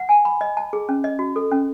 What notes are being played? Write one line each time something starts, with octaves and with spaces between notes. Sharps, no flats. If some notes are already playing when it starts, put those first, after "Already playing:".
Already playing: F#5
G#5
B5
D#5
A5
G#4
C#4
D#5
F#4
A4
C#4